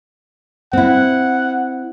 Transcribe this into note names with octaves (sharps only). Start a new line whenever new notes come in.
C4 E4 F#5